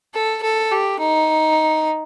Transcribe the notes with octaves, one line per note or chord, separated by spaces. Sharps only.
A4
A4
G4
D#4